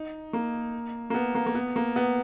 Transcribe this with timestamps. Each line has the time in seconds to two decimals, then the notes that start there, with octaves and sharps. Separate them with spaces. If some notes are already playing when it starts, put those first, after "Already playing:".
Already playing: D#4
0.33 A#3
1.10 A#3
1.14 B3
1.35 A#3
1.46 A#3
1.55 B3
1.76 A#3
1.96 B3